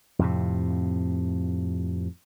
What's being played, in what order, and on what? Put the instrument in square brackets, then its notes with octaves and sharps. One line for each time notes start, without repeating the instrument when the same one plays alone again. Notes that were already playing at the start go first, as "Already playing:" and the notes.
[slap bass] F2 A2 C3